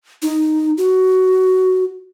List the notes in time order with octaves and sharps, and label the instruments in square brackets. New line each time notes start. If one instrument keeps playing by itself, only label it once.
[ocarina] D#4
F#4